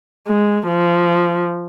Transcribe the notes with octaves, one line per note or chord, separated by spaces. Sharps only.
G#3
F3